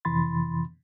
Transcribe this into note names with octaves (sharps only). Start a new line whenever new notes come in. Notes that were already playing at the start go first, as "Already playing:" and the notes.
F2 C3 E3 B5 C6 A6